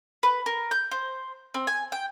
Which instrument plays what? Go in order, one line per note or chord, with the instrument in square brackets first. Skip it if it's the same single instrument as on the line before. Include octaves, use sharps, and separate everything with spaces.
[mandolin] B4
A#4
G6
C5
C4
G#5
G5